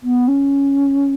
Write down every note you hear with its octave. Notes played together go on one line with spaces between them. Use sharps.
B3
C#4